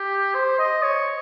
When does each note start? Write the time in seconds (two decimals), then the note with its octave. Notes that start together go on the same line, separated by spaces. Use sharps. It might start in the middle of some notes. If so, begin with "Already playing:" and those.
Already playing: G4
0.35 C5
0.59 D#5
0.83 C#5